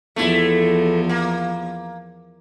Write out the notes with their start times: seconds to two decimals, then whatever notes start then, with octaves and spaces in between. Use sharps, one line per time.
0.16 E2 F3 A3 E4
1.09 A#3